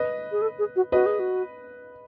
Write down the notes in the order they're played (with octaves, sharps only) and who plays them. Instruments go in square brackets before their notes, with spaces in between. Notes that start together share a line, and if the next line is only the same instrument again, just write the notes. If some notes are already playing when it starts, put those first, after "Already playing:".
Already playing: [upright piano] B4 D#5
[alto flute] G#4
A4
G#4
F#4
[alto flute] F#4 [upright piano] B4 D#5
[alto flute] G#4
F#4